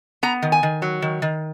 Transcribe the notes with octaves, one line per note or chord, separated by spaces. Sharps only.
B3 A#5
D#3
G#5
D#3
F#3
D#3
D#3